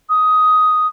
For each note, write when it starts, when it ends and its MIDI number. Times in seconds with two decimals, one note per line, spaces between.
0.09 0.87 87